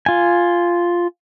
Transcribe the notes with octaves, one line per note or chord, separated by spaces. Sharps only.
F4 G#5